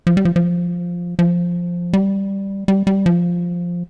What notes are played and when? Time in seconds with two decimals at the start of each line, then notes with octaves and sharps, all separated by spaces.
0.07 F3
0.17 G3
0.25 F3
0.36 F3
1.19 F3
1.93 G3
2.68 G3
2.87 G3
3.06 F3